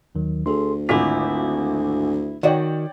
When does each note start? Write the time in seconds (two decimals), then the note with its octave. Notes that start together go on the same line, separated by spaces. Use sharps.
0.15 D#2 D#3 F#3
0.46 D2 G#4 A4 C6
0.89 G#1 D3 E4 F4 F#5 G#5 D6 B6
2.43 D#3 F#4 C#5 D5 G5